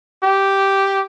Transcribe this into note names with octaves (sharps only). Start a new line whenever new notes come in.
G4